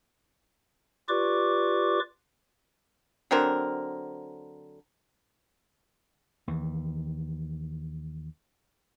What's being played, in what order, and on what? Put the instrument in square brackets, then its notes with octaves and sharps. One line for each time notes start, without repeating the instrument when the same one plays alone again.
[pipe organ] F4 G4 B4 D5 C#6 D6
[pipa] D3 F#3 C4 A#4
[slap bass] D#2 E3